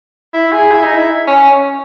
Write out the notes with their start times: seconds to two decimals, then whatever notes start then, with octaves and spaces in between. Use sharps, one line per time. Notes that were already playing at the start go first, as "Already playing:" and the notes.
0.34 E4
0.52 G#4
0.71 E4
0.83 D#4
0.96 E4
1.27 C#4